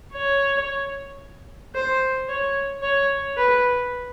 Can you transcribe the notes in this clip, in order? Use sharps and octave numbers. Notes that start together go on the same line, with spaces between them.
C#5
C5
C#5
C#5
B4